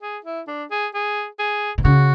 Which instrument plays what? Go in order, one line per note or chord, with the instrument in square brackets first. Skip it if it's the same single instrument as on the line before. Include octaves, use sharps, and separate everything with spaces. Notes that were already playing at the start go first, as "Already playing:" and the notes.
[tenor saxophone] G#4
E4
D4
G#4
G#4
G#4
[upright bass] B2
[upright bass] C#3 [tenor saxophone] F#4